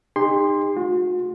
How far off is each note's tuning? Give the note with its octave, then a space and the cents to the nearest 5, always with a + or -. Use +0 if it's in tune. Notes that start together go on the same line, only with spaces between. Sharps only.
D#4 -20 G4 +45 C6 +0
A3 +0 F#4 -45